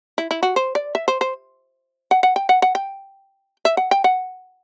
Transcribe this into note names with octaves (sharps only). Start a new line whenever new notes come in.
E4
E4
F#4
C5
D5
E5
C5
C5
F#5
F#5
G5
F#5
F#5
G5
E5
F#5
G5
F#5